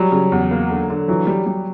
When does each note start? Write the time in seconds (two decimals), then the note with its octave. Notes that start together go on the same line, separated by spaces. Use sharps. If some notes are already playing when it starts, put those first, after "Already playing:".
Already playing: F#3 G3
0.12 C#3
0.32 E2
0.51 A#3
0.70 D3
0.90 D3
1.08 E3 F#3
1.27 G3
1.46 G3